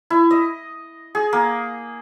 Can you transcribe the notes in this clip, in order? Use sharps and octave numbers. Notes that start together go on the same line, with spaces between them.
E4
D#5
G#4
A#3